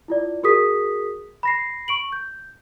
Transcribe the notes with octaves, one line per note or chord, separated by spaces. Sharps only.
E4 F4 D5
F#4 G#4 A#4 D#6 B6
B5 A#6 C7
C#6 D7 F#7
G6